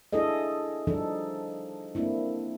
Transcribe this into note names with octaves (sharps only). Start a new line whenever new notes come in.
D4 E4 G#4 A4 D#5
F3 G3 D4 D#4 A4
A#3 C4 D4 E4